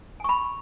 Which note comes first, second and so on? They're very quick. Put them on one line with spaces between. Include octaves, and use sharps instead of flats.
G#5 C#6 B5